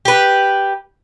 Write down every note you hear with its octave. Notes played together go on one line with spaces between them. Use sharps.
G4 B4